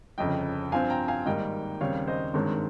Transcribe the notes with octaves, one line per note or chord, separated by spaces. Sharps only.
G1 F2 C#3 D#5 G5
G2 F3 C4 F5 G#5
G5 A#5
F5 G#5
G#1 G#2 G3 A#3 D#5 G5
D#2 C#3 G3 C4 C#5 F5
C5 D#5
G#1 G2 D#3 G#3 C4 A#4 C#5